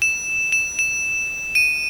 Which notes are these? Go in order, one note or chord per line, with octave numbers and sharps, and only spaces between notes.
E7
E7
E7
D#7